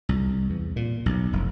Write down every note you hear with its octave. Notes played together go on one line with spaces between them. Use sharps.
C2
E2
A#2
B1
F1